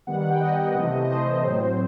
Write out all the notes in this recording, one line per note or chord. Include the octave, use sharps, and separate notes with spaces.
D#3 G3 B3 F#5
F#5
G5
D#3 G3 B3 D#5
C3 E3 A3
D#5
C3 E3 A3 C5
A2 F#3 C4